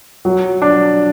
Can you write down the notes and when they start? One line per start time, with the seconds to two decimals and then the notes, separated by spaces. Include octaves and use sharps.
0.25 F#3
0.62 D4